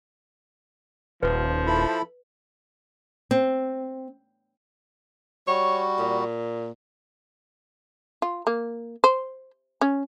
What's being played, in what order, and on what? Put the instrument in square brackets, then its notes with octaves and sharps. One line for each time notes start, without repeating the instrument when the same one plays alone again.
[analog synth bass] D#1 [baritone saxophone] F3 [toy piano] B4
[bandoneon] E4 A4 B5
[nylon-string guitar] C4
[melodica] G3 F#4 [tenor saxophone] C#5
[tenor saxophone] A#2
[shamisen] F4
A#3
C5
C#4